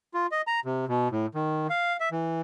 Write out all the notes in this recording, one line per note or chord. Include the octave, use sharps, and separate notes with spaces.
F4
D#5
A#5
C3
B2
A2
D#3
F5
E5
E3